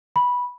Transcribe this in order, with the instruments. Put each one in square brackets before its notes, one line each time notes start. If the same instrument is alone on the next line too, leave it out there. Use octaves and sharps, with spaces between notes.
[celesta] B5